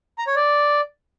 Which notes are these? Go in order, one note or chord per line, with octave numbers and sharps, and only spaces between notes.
A#5
C#5
D5